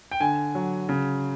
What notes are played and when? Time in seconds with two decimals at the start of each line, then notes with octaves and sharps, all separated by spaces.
0.11 G5
0.20 D3 G#5
0.55 F#3
0.89 C#3